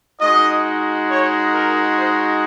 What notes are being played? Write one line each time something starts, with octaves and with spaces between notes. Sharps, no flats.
G#3 D#4 F#4 D#5
C#5
A#4
C5